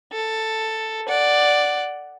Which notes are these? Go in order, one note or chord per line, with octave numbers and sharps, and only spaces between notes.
A4
D5 F#5